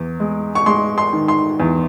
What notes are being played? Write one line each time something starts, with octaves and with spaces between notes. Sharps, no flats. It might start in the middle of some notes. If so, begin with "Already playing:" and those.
Already playing: E2
G#3
C#6
G#3 C6
C6
D#3
C6
E2